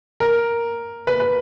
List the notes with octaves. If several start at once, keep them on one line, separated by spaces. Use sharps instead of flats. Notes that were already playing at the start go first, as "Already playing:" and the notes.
A#4
B4
B4